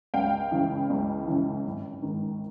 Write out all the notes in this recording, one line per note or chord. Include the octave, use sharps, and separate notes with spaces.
C#2 F5 G5
C#3 E3
C#2
C#3 E3
G#1
G#2 D#3